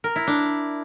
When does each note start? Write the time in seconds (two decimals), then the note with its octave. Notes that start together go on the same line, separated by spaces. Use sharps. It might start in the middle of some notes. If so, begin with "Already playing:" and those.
0.04 A#4
0.16 E4
0.27 D4